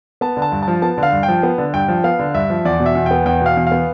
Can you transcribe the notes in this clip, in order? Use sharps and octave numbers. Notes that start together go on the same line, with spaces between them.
B3 A5
D3
A5
G2
A5
F3
B3 A5
D3 F5
G2
G5
F3
B3
D3
G2 G5
F3
B3 F5
D3
G2 E5
F3
E2 D5
B2
E5
E2
B3 G5
E2 G5
B2 F5
E2
B3 F5